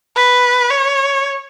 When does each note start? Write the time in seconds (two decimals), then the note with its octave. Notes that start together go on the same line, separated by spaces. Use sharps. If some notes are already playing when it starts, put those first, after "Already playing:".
0.16 B4
0.70 C#5